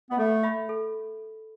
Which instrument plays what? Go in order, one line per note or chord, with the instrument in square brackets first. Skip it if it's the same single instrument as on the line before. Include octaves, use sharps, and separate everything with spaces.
[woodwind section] B3
[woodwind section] A3 [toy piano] A4
[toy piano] E5 B5
A4